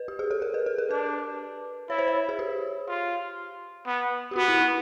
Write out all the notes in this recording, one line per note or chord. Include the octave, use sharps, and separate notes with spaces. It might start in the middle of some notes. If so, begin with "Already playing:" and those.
Already playing: B4
G4
G#4
A4
A#4
B4
A4
A#4
D4 B4
E4 C#5
C5
C#5
G#4
G4
F4
B3
G4
B3 F#4
E4
E4